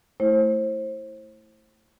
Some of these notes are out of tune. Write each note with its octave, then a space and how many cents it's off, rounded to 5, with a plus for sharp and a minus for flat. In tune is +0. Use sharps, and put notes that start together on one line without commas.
A3 +0 E4 -5 C5 +30